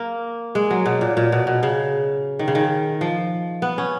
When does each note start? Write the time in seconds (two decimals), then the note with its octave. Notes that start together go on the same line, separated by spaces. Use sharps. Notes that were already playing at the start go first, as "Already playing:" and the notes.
Already playing: A#3
0.55 G#3
0.71 F#3
0.86 B2
1.01 A#2
1.17 A#2
1.32 B2
1.47 B2
1.63 C#3
2.39 D#3
2.48 C#3
2.55 D#3
3.01 F3
3.62 B3
3.78 C#4